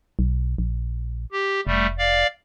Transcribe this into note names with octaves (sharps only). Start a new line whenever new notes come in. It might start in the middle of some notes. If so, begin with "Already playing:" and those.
B1
A#1
G4
F1 G3 A3
D5 F5